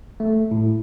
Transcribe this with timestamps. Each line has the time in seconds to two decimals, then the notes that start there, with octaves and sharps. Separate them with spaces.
0.20 A3
0.51 A2